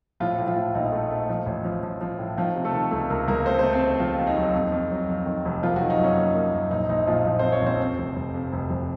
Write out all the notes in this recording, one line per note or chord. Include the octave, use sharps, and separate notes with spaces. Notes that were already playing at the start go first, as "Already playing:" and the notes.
A2 F3 F4
A2
F3 F4
A2
A#1 D#4
A3
A3
F3
A1
F3
F3
F3
A2
D#3 F3 F4
C3
A3 A4
D#3
C#2 A3 A4
C#2 A#3 A#4
C#2 A#3 A#4
A3 C4 C5
A3 C4 C5
C4 C5
D#2
D#2 F3 F4
D#2
D#4
F#3
F2
F2
F#3
F2
D#3
F1
F3 A#3 F4
D#3 F#3 F#4
D#4
F#2
C#4
A#3
A#3
F#2
A#1 D#4
A#1 D#4
A#2 F3 F4
F3
F3 C4 C5
C#4 C#5
A#1 C4 C5
F2
F1
F1
F2
F1
F1